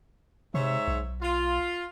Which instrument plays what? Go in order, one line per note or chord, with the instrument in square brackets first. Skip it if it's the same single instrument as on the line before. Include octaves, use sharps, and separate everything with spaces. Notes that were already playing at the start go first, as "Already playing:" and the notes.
[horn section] G#2 C#5 E5 [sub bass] C3
[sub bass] B1
[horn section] F4